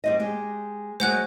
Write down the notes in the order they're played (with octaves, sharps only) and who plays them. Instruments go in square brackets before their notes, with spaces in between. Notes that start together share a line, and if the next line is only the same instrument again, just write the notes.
[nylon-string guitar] G3 C4 D#5
G#3 G4
[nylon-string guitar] F#3 G#3 [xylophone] C5 F#5 F#6